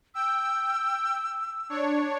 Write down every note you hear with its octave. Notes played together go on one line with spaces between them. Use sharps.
G5 E6
D4 C#5